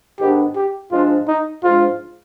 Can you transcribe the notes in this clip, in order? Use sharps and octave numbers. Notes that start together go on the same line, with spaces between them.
G#2 D#3 B3 D4 G4
G4
G#2 F3 G#3 D4 F4
D#4
G#2 F3 G#3 D4 F4